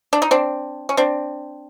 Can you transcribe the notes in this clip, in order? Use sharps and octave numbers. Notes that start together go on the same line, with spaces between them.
D4
D#4
C4 D4
C#4
C4 D4